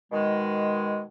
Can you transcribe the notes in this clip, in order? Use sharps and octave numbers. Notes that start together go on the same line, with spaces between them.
B2 D#3 G#3